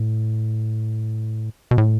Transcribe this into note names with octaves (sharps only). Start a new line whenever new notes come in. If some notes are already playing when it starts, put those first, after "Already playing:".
Already playing: A2
B2
A2